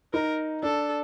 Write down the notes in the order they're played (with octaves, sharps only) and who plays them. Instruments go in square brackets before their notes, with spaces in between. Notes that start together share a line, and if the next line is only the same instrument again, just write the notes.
[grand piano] D#4 [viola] A#4
[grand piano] D4 [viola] A4